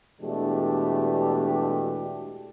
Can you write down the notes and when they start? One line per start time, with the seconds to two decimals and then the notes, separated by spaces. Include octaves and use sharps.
0.20 E2 B2 G#3 A3 D4 G4